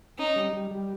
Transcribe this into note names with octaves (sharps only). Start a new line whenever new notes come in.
C#4 D#4
G3
G3
G3